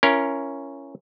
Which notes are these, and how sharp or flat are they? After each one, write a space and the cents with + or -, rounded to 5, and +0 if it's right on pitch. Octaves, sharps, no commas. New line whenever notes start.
C#4 +0 E4 +35 A#4 +0